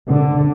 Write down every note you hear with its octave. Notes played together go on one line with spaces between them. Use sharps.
D3